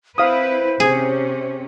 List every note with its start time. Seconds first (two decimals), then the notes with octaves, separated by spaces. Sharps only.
0.18 C4 E4 B4 C5 F5 D#6
0.80 C3 C#4 G#4